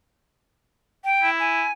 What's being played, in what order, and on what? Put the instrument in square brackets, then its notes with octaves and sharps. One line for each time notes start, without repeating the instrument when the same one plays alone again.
[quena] G5
[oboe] E4
[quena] G#5